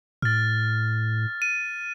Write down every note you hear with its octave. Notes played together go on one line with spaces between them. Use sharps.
A2 F6 A6
D#7